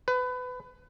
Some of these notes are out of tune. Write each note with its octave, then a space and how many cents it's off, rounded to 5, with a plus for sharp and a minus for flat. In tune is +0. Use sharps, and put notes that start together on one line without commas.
B4 +25